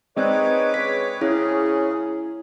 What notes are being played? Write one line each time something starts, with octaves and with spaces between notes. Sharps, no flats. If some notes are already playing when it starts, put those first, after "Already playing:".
G#3 C4 D#4 B4 C#5 D5 D6
C#3 B6
C#3 C#4 E4 G#4